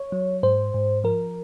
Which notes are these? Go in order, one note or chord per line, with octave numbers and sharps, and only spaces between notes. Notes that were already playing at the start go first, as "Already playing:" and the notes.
Already playing: C#5
F#3
G#2 C5
G#2
F3 A#4